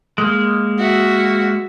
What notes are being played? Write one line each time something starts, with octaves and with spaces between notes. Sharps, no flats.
G#3 A#3
F#4 E5